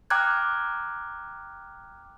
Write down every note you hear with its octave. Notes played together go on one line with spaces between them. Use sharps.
G5 A#5 D6 F6 F#6 G#6